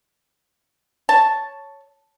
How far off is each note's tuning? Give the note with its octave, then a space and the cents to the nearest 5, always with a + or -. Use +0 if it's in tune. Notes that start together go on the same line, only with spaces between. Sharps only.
C#5 +0 A5 +0